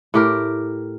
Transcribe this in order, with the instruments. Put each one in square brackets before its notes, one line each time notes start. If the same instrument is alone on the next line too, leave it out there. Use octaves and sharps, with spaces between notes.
[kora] A2 G4 A#4